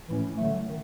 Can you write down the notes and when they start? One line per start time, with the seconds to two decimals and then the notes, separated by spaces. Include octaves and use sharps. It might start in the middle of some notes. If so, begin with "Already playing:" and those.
0.09 A2 E3 A3 C#4 E4
0.37 D3 F#3 A3
0.66 D#3